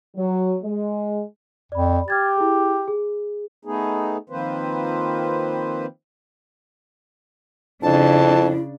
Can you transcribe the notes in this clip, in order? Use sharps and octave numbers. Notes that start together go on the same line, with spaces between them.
F#3
G#3
F2 D5 B5
G4 F6 G#6 A6
E4 G#4
G#4
A3 B3 D#4 G#4
D#3 F3 A#3 C4 B4 C5
F2 C#3 D4 E4 A5